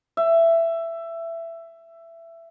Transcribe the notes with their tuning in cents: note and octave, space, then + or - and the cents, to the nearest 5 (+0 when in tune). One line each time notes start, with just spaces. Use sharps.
E5 +15